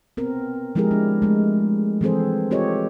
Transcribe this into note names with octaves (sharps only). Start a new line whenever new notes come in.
B3 C4 A#4
F3 G#3 E4 G4 G#4 A#4
D4
G#3 A3
E3 F3 C4 G#4 A4 C5
C4 F4 G4 A4 C#5 D#5